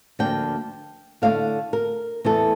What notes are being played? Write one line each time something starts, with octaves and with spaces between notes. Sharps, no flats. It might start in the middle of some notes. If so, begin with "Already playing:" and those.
D2 D3 F3 A#3 D4 G5
D3 A3 E4 F5
A#4
E2 E3 A3 E4 A4